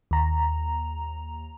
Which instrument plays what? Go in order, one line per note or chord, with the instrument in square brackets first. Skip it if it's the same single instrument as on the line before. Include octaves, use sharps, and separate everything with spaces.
[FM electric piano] D#2 A#5